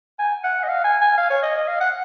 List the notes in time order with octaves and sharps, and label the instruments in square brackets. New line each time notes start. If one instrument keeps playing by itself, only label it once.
[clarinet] G#5
F#5
D#5
F5
G#5
G#5
F5
C#5
D#5
D#5
F5
F#5